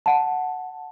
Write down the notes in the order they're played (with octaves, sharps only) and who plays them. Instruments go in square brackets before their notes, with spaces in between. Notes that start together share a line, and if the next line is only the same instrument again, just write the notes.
[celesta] F#5 A5